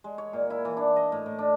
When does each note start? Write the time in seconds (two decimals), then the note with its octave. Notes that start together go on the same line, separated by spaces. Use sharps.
0.04 G#3
0.18 C#5
0.33 A#2
0.50 E4
0.65 E3
0.77 D4
0.96 D#5
1.12 A2
1.26 A2
1.39 D4